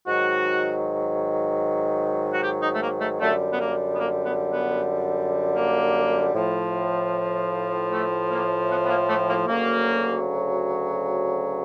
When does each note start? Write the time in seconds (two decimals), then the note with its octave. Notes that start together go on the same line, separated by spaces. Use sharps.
0.07 G#2 D#3 F#3 F#4
2.34 F#4
2.43 G4
2.63 D#4
2.75 A3
2.82 A#3
3.01 A3
3.21 F#2 D3 G3 A3
3.53 B3
3.60 A#3
3.95 B3
3.99 A#3
4.25 B3
4.52 B3
5.56 A#3
6.35 A2 F3
7.91 A3
8.31 A#3
8.70 B3
8.85 B3
8.90 A#3
9.09 A3
9.29 A#3
9.48 D2 C#3 F#3 A#3